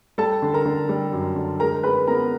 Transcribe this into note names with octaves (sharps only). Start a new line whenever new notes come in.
G3 A4 A5
D3
A#4 A#5
D3
G3
F#2
D3
G#3 A#4 A#5
G#3 B4 B5
B3 A#4 A#5